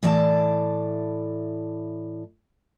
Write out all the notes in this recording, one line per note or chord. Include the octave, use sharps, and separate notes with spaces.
A2 E3 D5 G#5 A5